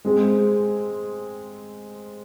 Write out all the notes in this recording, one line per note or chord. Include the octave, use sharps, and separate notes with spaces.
G#3 C4 G#4